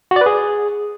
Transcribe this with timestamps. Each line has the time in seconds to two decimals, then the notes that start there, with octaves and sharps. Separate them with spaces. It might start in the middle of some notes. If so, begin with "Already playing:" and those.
0.11 F#4
0.16 D5
0.21 B4
0.26 G#4